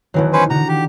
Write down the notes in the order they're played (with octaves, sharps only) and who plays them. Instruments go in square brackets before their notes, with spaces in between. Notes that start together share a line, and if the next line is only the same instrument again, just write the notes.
[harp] E1 D#3 [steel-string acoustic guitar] B2 E3 F#3
[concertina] C#4 B4 C5
[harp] D3 D#4 [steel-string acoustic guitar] F#4 [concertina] A#5
[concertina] G4